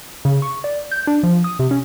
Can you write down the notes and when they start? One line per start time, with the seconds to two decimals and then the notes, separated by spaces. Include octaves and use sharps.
0.25 C#3
0.42 C#6
0.64 D5
0.91 G6
1.07 D4
1.23 F3
1.44 D#6
1.59 C3
1.71 C#4